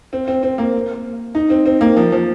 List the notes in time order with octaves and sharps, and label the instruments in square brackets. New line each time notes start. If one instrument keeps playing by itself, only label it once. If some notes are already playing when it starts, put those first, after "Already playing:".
[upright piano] C4
C4
C4
A#3
D#4
C4
C4
A#3
F3
F3